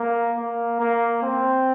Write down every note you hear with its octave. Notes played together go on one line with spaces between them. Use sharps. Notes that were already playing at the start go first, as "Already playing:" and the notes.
Already playing: A#3
A#3
A#3
C4